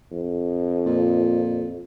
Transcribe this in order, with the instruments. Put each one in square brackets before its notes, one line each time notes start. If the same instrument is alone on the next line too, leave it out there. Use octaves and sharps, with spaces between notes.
[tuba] F2
[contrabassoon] A#2